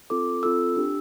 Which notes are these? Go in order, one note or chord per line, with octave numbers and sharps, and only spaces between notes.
C4 F4 A4 D6
C4 F4 A4 E6
D4 G4